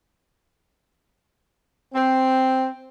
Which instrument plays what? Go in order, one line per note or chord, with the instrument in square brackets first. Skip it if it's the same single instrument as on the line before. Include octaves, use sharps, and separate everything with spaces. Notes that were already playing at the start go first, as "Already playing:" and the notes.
[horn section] C4